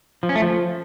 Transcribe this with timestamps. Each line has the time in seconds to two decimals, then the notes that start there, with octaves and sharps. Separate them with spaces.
0.23 F3
0.29 C#4
0.35 A3
0.42 F3